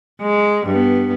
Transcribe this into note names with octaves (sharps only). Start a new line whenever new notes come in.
G#3
G2 B3